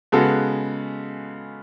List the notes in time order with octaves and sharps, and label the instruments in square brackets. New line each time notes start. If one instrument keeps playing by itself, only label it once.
[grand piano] C#3 G#3 B3 F#4 A4